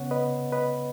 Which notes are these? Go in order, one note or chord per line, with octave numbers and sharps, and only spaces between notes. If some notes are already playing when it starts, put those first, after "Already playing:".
Already playing: C#3 B3 C#5 F#5
B4 D#5
B4 D#5